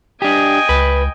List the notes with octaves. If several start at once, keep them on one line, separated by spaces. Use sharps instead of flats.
D4 G4 D#5 G5 G#5
C#2 B4